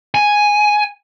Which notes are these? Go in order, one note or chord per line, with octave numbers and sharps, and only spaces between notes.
G#5